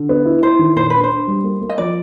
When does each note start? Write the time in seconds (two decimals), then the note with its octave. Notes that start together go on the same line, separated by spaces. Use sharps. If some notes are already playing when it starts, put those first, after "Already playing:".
Already playing: D3
0.09 B3
0.25 E4
0.42 E4 C5
0.59 D#3
0.76 A#2 C5
0.90 D4 B4
1.04 C5
1.10 D4
1.28 G3
1.44 A#3
1.61 A#3
1.69 D#5
1.78 F3 D5